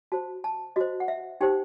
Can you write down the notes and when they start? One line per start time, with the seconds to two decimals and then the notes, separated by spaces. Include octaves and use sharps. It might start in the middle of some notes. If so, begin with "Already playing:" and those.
0.12 F#4 C5 A5
0.44 A5
0.76 F#4 C5 D#5
1.00 F#5
1.08 E5
1.41 D#4 G4 C5 G5